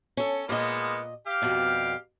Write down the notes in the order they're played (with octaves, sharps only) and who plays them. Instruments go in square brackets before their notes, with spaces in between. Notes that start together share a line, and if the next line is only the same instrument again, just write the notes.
[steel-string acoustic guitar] C#4 A4
[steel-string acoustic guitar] A#2 D#5 [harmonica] G#3 A#3 B3
[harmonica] G4 F5
[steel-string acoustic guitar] F2 B2 G3